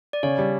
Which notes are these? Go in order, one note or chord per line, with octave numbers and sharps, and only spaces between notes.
D5
C#3 C#5
G3